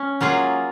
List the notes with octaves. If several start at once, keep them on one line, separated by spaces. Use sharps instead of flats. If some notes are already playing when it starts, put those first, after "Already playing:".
Already playing: C#4
F#3 A#3 F4 G#4